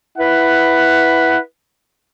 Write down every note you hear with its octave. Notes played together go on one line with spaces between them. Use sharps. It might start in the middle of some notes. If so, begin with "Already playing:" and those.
E4 B4 F#5